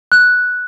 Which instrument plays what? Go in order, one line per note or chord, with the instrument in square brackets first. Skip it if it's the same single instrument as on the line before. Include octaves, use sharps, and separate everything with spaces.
[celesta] F#6